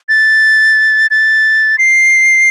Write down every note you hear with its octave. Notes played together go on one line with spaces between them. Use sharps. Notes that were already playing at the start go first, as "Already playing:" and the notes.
A6
A6
C7